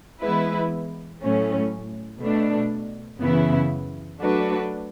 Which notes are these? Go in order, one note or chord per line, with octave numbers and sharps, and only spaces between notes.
E3 G#3 B3 E4 B4
A2 F#3 A3 C#4
B2 A3 D4
F#2 C#3 E3 B3 E4
F#3 A3 D4 F#4 B4